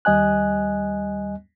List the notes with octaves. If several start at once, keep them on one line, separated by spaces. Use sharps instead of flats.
D#2 G3 D#5 G#5 F#6